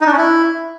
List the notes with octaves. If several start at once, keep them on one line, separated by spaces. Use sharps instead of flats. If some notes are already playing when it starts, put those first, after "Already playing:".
D#4
D4
C#4
E4